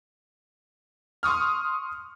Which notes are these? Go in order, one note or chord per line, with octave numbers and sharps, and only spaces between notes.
C6 C#6 D#6 F6